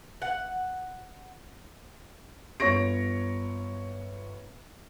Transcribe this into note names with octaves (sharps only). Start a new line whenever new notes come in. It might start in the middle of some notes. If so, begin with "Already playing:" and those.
F#5
G1 C#5 C#6 A#6 D7